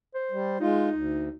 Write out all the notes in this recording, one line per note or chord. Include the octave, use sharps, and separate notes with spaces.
C5
G3
G#3 D#4 F4
D2